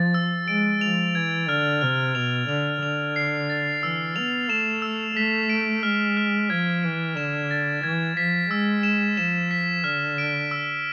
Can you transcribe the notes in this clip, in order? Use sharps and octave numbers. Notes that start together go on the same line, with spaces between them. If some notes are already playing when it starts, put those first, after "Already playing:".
Already playing: F3 A6
E6
G#3 D7
F3 F7
E3 G#6
D3 F6
C3 F6
B2 F7
D3 F7
D3 F7
C7
A6
E3 E6
B3 F7
A3 E7
E6
A3 B6
D7
G#3 F6
F6
F3 G#6
E3 D7
D3 E7
A6
E3 G#6
F3 B6
G#3 E6
E7
F3 E7
B6
D3 F6
D7
E6